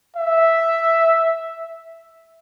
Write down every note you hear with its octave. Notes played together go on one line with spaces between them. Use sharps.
E5